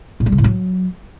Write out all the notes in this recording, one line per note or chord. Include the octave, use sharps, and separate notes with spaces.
A#2
G3
C#3
A2
F#3